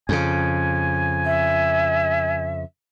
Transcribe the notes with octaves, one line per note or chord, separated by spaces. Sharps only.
F2 C#3 G#5
E5